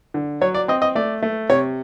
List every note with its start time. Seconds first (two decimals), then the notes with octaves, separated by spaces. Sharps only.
0.14 D3
0.41 F#3 C#5
0.54 D5
0.68 C4 D#5
0.82 D#5
0.95 A3 D5
1.22 A3
1.49 C3 C#5